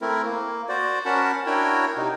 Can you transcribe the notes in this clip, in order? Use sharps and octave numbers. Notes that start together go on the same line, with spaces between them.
A3 C4 E4 A#4
A#3
F#4 C5 D5
C#4 F#4 A#4 F#5 A5 B5
D4 E4 F#4 A#4 C#5 G5
C3 D#4